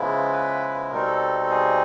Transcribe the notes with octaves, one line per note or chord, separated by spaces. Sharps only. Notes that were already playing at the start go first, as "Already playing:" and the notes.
Already playing: C#3 F3 G#3 B3 E4
B4
B2 G3 C4 D#4 A#4
A4
A4
G#4